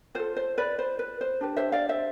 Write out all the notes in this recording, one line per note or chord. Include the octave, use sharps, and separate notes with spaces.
F4 A4 C5
C5
B4 D5
C5
B4
C5
D4 G4 B4
C5 E5
D5 F5
C5 E5